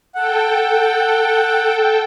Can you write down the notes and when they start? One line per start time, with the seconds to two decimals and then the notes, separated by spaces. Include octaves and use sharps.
0.15 A4 F#5 G5